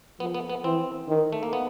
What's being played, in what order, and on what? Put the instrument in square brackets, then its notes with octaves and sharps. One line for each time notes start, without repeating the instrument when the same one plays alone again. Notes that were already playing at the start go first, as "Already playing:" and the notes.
[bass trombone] F3 [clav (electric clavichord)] B3
[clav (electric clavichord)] B3
B3
[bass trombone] E3 [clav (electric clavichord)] C4
[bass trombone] D#3
[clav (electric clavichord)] A3
A#3
B3